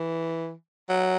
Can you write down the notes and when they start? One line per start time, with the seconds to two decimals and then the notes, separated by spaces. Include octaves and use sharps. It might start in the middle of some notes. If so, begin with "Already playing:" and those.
Already playing: E3
0.90 F#3